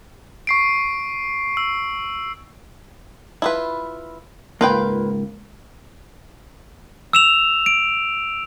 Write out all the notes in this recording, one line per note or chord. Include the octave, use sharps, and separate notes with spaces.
C#6 C7 D7
E6
E4 F4 B4
C#2 G#2 A#3 F4 B4 G5
E6 E7 F7
D7